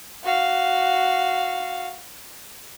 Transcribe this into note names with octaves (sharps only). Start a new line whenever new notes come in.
F#4 F5